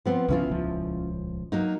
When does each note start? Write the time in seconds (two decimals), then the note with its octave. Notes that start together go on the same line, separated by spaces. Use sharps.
0.05 F3 B3 C4
0.28 C2 C#3 F3 C#4 E4 F4
0.48 D#1 C#2 F3
1.52 F#3 A#3 D#4